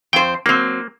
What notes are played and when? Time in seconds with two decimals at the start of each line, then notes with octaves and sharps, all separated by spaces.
0.13 F2 C5 G5
0.46 F#3 A#3 C4